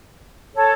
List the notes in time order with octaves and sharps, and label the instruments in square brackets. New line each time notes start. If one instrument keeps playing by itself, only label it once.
[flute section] A4 C#5